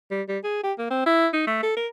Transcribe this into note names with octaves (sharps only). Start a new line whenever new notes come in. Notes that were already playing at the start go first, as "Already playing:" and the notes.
G3
G3
G#4
G4
A#3
C4
E4
D#4
A3
A4
A#4